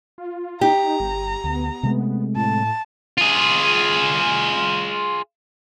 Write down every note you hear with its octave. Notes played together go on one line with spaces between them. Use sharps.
F4
D#4 G4 A#5
G1
D2 B3
C3 G#3 A3
A2 A5
F4 G#4